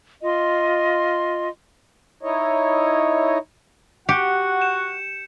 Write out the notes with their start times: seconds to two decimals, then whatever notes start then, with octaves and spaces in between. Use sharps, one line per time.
0.22 F4 D#5 C6
2.23 D#4 E4 C#5 D#5
4.09 F#4 G4 F#5 C#7
4.60 G6 E7